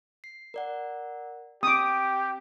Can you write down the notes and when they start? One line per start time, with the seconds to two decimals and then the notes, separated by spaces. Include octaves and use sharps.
0.24 C7
0.54 A#4 D5 F#5
1.63 C4 G4 D6 D#6